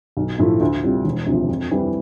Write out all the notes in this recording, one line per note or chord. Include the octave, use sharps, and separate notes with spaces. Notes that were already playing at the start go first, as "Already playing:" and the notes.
B1
A2 F3 A3 E4
D2
C3 G3 C4 F4
E1
D2 C3 F3
F2
E3 G3 C4